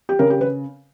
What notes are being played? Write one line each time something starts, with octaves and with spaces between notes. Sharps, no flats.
G4
C#3 A#4
G4
B4